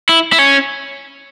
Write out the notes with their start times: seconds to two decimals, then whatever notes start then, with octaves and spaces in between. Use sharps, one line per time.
0.09 E4
0.33 E4
0.39 C#4